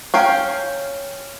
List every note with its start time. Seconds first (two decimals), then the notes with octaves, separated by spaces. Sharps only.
0.14 C#4 F5 G5